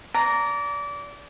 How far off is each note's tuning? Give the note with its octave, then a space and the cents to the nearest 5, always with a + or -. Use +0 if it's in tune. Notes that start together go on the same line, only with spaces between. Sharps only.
D5 -25 A#5 -5